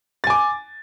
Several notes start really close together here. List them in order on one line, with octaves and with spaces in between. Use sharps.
A6 G#5 D6